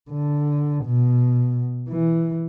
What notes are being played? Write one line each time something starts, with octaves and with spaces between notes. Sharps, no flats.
D3
B2
E3